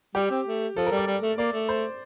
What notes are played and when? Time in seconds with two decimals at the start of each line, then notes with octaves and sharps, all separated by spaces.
0.15 G3 G4
0.31 C4
0.46 A3
0.77 F3 A4
0.86 A#4
0.91 G3
0.97 D5
1.07 G3
1.22 A3
1.38 A#3 D5
1.53 A3
1.69 C5